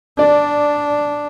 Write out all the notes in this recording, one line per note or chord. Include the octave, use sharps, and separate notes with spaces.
D4 D5